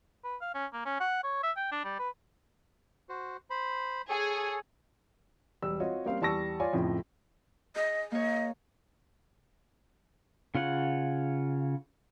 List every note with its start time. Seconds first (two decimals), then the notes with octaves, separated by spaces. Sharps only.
0.24 B4
0.41 F5
0.54 C#4
0.73 A#3
0.86 C#4
1.00 F#5
1.24 C#5
1.43 E5
1.57 G5
1.72 D4
1.84 G3
1.99 B4
3.09 F#4 C5
3.50 C5 B5
4.09 G#4 A4 C#5
5.62 E1 G3 E6
5.80 C4 F4 F#4 C#5 D#5
6.05 G3 A#3 C4 C#4 F5
6.21 E2 G3 A5 C#6 E6 A#6
6.60 F4 C#5 D5 G#5
6.73 F2 A2 C#3 F3
7.76 G#4 D#5
8.12 A#3 C#5 D#5
10.55 C#3 F4 C#5 F#5